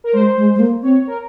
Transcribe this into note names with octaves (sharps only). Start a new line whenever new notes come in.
A#4
G#3 C5
G#3
G#3
A#3
C4 C#5
A#4